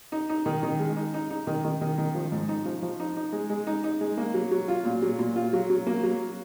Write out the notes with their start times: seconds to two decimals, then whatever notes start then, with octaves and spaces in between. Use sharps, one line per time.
0.12 D#4
0.29 D#4
0.46 D#3
0.63 D#3
0.79 G#3
0.97 D#4
1.14 D#4
1.30 D#4
1.47 D#3
1.65 D#3
1.81 D#3
1.98 D#3
2.15 F3
2.32 G#2
2.49 D#4
2.66 F3
2.82 F3
3.00 D#4
3.17 D#4
3.33 G#3
3.50 G#3
3.67 D#4
3.84 D#4
4.01 G#3
4.17 A#3
4.34 F#3
4.51 F#3
4.68 F4
4.85 A#2
5.02 F#3
5.19 A#2
5.36 F4
5.53 F#3
5.70 F#3
5.87 A#3
6.03 F#3